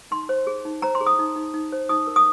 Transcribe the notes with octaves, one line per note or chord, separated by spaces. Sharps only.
D#4 C6
C5
G#4
D#4
C5 A#5
C6
G#4
D#6
D#4
D#4
D#4
C5
D#4 D#6
A#4
D#6